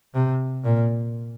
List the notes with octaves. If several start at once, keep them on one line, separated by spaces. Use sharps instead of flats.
C3
A#2